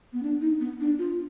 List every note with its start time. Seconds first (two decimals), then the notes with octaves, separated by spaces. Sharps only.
0.13 B3
0.23 D4
0.41 D#4
0.60 B3
0.80 D4
0.99 F4